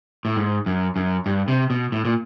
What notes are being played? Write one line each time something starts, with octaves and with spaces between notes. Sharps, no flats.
A2
G#2
F#2
F#2
G2
C3
B2
A2
A#2